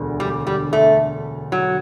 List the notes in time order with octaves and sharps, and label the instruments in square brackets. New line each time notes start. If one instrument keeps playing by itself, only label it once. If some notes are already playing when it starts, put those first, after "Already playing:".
Already playing: [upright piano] E1 D2 D3
[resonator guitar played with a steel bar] G3
G3
A3
F#3